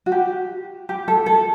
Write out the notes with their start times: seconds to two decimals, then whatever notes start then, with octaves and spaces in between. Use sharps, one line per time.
0.06 F#4
0.12 G4
0.89 G4
1.08 A4
1.26 A4